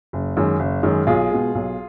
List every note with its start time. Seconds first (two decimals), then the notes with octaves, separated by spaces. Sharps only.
0.13 F#1
0.37 F#2 D#3 G#3
0.59 F#1
0.83 F#2 D#3 G#3
1.07 B1 F4 G#4
1.31 B2 G#3
1.55 B1